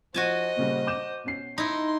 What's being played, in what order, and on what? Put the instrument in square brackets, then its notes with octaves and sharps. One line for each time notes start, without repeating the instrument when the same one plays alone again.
[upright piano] F3 [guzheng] F#4 G#5 A5 [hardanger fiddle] C5 D#5
[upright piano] A#2 C#3 G3
D6 G6 E7
B2 C#4 C7
[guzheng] D#4 E4 [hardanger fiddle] C6